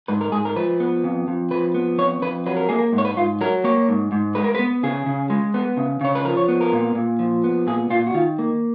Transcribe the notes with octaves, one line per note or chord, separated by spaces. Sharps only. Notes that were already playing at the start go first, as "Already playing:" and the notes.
G#2 B4
A#4
G#2 G#4
A#4
F3 B4
B3
F2
F2
F3 B4
B3
F2 C#5
F2 B4
F#3 B4
A#4
A#3 G#4
A#4
G#2
C#5
B4
G#2 F4
F#3 A#4
A#3 C#5
G#2
G#2
G#3 B4
A#4
B4
B3
C#3 G#4
C#3
G#3
B3
C#3
C#3 C#5
B4
F3 A#4
C#5
B3
A#4
A#2
A#2
F3
B3
A#2 G#4
A#2 F4
F#4
D#3 F4
A#3